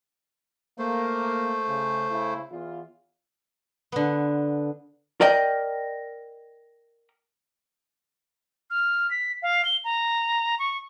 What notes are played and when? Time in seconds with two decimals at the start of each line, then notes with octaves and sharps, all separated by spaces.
0.79 A3 A#3 C5
1.68 C#3
2.11 C#3 E4
2.51 E2 F4
3.92 D3 B3
5.21 A#4 D5 D#5 G5
8.70 F6
9.11 B6
9.42 F5
9.65 G7
9.84 A#5
10.59 C#6